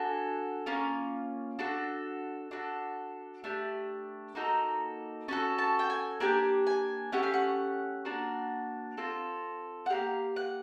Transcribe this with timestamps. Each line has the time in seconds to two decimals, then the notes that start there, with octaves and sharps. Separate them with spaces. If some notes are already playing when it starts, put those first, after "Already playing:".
Already playing: D4 F#4 A4 G#5
0.66 A#3 C#4 F4
1.59 D4 F#4 A4
2.51 D4 F#4 A4
3.44 A3 D4 G4
4.35 A#3 D#4 F#4 A4
5.28 C#4 F#4 A4 A5
5.58 A5
5.79 G5
5.90 G#5
6.20 A#3 D4 G4 G#5
6.67 G#5
7.12 A3 C#4 G4 F#5
7.23 F5
7.34 F#5
8.05 A#3 D4 F#4
8.97 C4 F4 A4
9.86 F#5
9.90 A#3 D#4 G4 F5
10.36 F#5